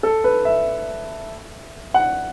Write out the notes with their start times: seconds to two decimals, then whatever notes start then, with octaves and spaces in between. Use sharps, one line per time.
0.03 A4
0.24 B4
0.45 E5
1.94 F#5